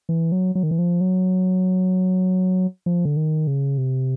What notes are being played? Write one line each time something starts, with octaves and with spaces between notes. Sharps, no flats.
E3
F#3
F#3
D#3
E3
F3
F#3
F3
D3
D#3
C#3
C3